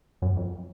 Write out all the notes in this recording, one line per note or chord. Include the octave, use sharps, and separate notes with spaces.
F#2
F2